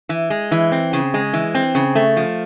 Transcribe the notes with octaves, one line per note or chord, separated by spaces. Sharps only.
E3
G#3
E3
C4
C#3
G#3
E3
C4
C#3
A3
F3